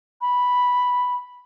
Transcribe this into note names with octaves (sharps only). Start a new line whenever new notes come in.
B5